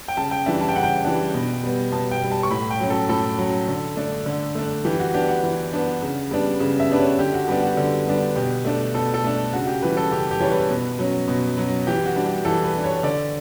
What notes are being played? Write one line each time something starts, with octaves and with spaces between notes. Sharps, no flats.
G5
C#3 A5
G5
E3 G3 D4 E5
A5
G5
C#3 F#5
G5
E3 G3 D4
B2
G3 B3
B2 A5
G5
G3 B3
A5
C#6
A2 B5
G5
F#3 C#4
A4
A2 A4
F#3 C#4
D3
A3 D4
D3
A3 D4
E3 G4
F#4
B3 D4 G4
F#5
E3
B3 D4
C#3
G3 B3 D4
C#3
E5
G3 B3 D4 B4
C#5
D3 G4
F#4
G3 B3 D4 G4
F#4
D3
G3 B3 D4
B2 G4
A3 D4
B2 A4
A4
A3 D4
C#3 F#4
G4
E3 G3 B4
A4
C#3 G4
G4
E3 G3 C#5
B4
B2
F#3 C#4
B2
F#3 C#4
E3 G4
F#4
G3 D4
G4
E3 A4
B4
G3 D4
C#5
D3 D5